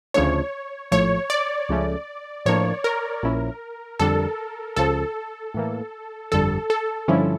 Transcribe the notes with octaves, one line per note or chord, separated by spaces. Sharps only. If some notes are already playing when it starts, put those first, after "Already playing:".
D2 C#3 F3 A3 D4 C#5
A#1 A2 F3 A3 C#5
D5
C#2 C#3 F3 A3 C#4
A2 F3 A#3 D4 C#5
A#4
A#1 A#2 F3 C#4 E4
F2 D3 G3 D4 A4
C#2 C#3 F3 A4
A2 E3 A#3
G1 F2 D3 G3 A4
A4
G2 D3 F3 C#4 E4